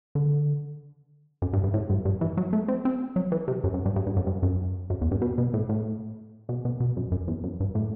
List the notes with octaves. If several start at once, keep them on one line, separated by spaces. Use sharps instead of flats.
D3
F#2
G2
G2
A2
G2
G2
E3
F#3
A3
C4
C4
F#3
E3
C3
F#2
F#2
G2
G2
G2
F#2
G2
F#2
F#2
E2
G2
B2
B2
A2
A2
B2
B2
B2
F#2
F#2
E2
F#2
G2
A2